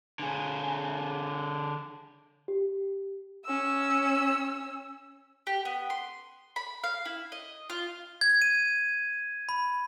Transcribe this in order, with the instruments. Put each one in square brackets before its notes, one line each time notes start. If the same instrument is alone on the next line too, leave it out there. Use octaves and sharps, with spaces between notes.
[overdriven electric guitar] D3 G#4
[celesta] G4
[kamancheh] C#4 E6
[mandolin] G4
B3
C6
B5
F5
E4
D#5
F4
[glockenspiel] G#6
D#7
B5